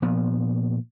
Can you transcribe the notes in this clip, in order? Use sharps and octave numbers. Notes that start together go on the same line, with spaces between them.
A#2 F3 B3